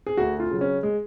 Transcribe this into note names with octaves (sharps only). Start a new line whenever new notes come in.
G#4
D2 F#4
F4
C#3 F#3
C#4
G#3